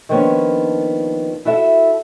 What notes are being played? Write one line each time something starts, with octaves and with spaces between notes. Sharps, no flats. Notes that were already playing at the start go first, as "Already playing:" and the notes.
D#3 F3 A#3 B3 C#4 D4
E4 F#4 A4 E5